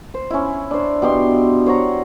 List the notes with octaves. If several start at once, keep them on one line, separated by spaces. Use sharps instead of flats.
C5
C#4 E4
D4 C5
B2 G4 C6
C5 C#5 F#5 A#5